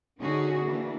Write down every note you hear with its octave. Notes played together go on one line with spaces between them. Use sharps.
D3 C#4 D#4 F#4 G#4
E3 A#3 D4